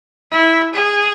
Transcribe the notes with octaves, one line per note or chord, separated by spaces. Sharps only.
E4
G#4